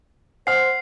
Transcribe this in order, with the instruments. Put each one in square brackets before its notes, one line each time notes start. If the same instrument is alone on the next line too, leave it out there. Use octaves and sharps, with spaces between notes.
[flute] C5 [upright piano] F#5 C6 F6 [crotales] C7